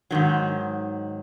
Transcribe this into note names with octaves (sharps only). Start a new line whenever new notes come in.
G#2 D#3 F#3